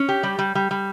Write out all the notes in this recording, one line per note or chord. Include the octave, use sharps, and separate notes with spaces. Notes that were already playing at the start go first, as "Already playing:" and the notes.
Already playing: C#4
G4
G3
G3
G3
G3